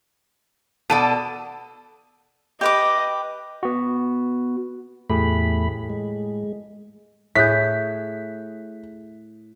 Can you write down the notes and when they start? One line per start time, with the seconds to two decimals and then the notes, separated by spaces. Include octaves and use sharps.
0.90 B2 A4 D5 A5 D#7
2.61 G4 B4 D#5 D6
3.63 B3 F#4
5.10 E2 A2 A3 G4 G#4 B5
5.90 G#3
7.35 A2 G#4 E5 F#6 G6 B6